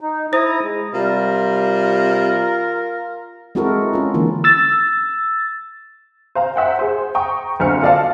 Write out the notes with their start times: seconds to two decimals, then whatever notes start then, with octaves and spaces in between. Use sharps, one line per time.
0.01 D#4
0.33 E4 C5 A#5 D#6
0.63 G#3
0.94 C3 G3 F4 A#4
3.55 G#3 C4 E4 F#4 A4 A#4
3.93 C#4 F4
4.14 D3 E3 A#3
4.44 E6 A6
6.35 C5 F5 A#5
6.56 C5 E5 F#5 G5
6.79 G#4 C5
7.15 G5 A#5 C#6 D#6
7.60 F#1 B1 D3 C4 F6 C#7
7.82 F4 A4 D5 D#5 F5 A5